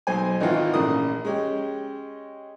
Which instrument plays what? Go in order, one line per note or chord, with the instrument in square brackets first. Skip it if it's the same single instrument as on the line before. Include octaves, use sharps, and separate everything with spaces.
[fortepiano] B1 C5 G#5
G#1 G#2 D#3 E3 F4 F#5
A#1 C#3 A3 A#4 D#6
G#3 C#4 G4